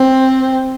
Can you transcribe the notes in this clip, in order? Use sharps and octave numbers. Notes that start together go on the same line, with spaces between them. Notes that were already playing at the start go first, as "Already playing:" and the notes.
Already playing: C4